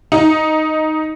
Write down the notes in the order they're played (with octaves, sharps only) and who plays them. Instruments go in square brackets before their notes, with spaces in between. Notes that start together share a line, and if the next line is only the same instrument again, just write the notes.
[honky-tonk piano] D#4